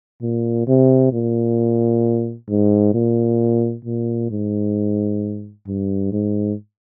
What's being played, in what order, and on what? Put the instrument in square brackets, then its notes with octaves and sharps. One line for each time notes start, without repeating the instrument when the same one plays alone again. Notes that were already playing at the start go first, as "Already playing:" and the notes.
[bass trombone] A#2
C3
A#2
G#2
A#2
A#2
G#2
G2
G#2